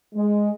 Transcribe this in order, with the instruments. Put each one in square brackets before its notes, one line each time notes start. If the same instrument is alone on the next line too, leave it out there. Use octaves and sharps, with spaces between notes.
[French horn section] G#3